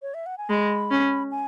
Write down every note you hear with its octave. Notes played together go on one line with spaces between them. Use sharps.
C#5
E5
F#5
G#5
G#3 B5
C#4
G#5